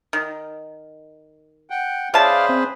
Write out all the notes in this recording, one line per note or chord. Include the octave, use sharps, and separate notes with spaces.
D#3
F#5 G5
C#3 G#4 B4 C5 D5 E5 F5 A5
C4